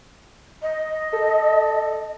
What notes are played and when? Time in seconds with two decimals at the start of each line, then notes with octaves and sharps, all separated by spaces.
0.62 D#5
1.13 A4